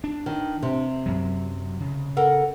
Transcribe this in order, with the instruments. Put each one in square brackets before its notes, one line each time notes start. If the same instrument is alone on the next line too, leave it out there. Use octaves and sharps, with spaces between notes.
[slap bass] D4
[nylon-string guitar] D#3
C3
[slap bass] F#2 F#3
C#3
[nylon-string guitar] A4 A#4 F#5